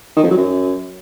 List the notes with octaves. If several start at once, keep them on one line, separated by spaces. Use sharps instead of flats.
D#3
F2
F#3
F#2